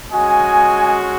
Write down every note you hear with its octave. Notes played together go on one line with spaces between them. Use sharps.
G#3 C#4 F#4 D#5 G#5